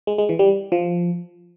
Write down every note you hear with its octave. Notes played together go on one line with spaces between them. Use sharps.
G#3
G#3
E3
G3
F3